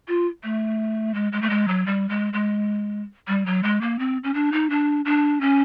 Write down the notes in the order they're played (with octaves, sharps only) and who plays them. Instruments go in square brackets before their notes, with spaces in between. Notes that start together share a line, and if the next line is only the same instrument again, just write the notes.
[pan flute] F4
A3
G#3
G#3
A3
G#3
F#3
G3
G#3
G#3
G3
F#3
G#3
A#3
C4
C#4
D4
D#4
D4
D4
C#4